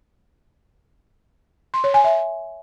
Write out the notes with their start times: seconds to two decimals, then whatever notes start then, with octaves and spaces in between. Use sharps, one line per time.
1.74 C6
1.84 C#5
1.94 G#5
2.04 E5